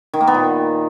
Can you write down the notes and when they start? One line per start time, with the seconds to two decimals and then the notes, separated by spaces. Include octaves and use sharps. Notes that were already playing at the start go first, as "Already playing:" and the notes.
0.14 D#3
0.20 A#3
0.27 B3
0.34 A#2